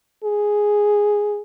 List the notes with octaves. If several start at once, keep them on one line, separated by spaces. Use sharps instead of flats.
G#4